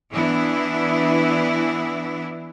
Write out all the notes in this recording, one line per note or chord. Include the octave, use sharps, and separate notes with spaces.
E3 B3 D4 E4